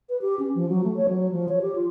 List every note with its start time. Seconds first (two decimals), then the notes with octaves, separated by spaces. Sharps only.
0.09 B4
0.21 G4
0.39 C#4
0.55 F3
0.69 F#3
0.84 A3
0.97 C#5
1.09 F#3
1.32 F3
1.49 C#5
1.62 G4
1.76 F4